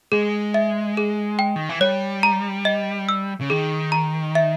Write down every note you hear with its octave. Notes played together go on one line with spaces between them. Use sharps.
G#3 G#4
E5
G#4
G5
D#3
E3
G3 C#5
A#5
D#5
E6
C#3
D#3 G#4
A#5
E5